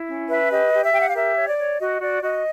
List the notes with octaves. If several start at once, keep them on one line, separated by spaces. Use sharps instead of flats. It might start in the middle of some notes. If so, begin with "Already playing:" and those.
Already playing: E4
C#4
B4 E5
G4 D#5
G4
E5
G4 G5
F#5
F5
A#4 E5
C#5
D5
C#5
F#4 D#5
F#4 D5
F#4 D#5